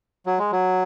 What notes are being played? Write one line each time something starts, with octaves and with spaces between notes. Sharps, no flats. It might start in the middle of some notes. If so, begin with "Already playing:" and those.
F#3
G#3
F#3